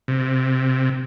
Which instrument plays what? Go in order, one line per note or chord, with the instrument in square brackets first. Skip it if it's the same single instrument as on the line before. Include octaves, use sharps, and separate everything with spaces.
[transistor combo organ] C3